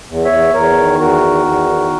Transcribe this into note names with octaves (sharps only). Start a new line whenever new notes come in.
E2
C#5 E5
E2
E2 A#4 C#5
D#3
E2 F#4 A#4
D#3
E2
D#3